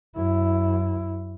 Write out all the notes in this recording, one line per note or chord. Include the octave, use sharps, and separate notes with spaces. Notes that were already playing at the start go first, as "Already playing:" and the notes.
F#2 E4